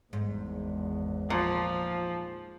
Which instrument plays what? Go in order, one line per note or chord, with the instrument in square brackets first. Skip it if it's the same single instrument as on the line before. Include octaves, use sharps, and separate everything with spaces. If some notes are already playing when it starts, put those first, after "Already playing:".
[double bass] G#1 E2 [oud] G#2
[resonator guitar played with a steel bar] A#2 [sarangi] F3